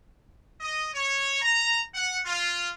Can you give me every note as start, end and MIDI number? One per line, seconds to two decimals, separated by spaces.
0.60 0.87 75
0.93 1.42 73
1.42 1.80 82
1.93 2.18 78
2.25 2.68 65